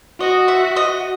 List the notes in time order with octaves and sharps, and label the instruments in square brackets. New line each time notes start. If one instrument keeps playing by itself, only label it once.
[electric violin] F#4 [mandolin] D#5
[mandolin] E5
D#5